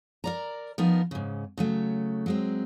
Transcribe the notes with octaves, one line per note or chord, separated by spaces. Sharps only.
A#4 D5 A#5
F3 B3 D#4 A#4
G#2 C#3
C#3 F#3 A3
F#3 G#3 C4